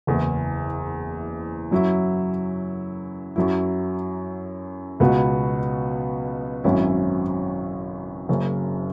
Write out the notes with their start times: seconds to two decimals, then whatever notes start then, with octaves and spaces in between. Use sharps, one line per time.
0.07 F#1 E2 E3
1.71 F#2 F#3 E4
3.36 F#2 F#3 E4
5.00 C#2 B2 B3 F#4
6.64 G#1 F#2 F#3 C#4 E4
8.29 F#1 F#2 C#3